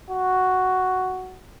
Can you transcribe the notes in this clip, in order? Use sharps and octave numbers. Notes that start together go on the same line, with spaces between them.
F#4